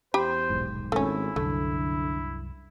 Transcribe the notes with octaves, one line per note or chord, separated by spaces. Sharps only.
E2 G4 C5 B5
D#1 B1 G#2
G#1 A3 C#4 E4
C2 F#2 D3 A3